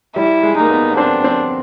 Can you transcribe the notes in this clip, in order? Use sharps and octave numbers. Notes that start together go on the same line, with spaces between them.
G3 E4
G#3
A#3 D#4
B3
B3
C4 D4
C4